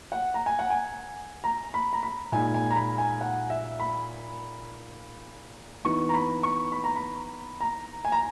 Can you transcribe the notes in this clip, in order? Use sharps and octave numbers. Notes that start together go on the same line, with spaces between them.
F#5
A#5
G#5
F#5
G#5
A#5
B5
A#5
B5
A#2 G#3 D#4 G#5
G#5
A#5
B5
G#5
F#5
E5
B5
E3 B3 D#4 C#6
A#5
B5
C#6
B5
A#5
B5
A#5
G#5
A#5